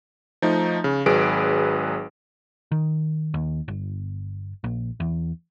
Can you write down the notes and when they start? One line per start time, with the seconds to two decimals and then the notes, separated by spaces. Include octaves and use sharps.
0.42 F3 A3 D#4
0.84 C#3
1.06 G#1 F#3 G#4 B4 D7
2.72 D#3
3.34 D#2
3.68 G1
4.64 A#1
5.00 E2